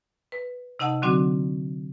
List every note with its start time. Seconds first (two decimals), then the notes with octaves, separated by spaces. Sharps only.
0.32 B4
0.79 C3 D#4 D#5 F#5 A5
1.02 D3 F#3 C4 D4 F#4